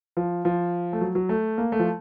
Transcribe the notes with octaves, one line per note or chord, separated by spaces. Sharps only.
F3
F3
A3
F#3
F#3
A3
A#3
A3
F3